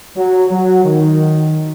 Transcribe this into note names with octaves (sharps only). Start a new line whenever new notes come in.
F#3
F#3
D#3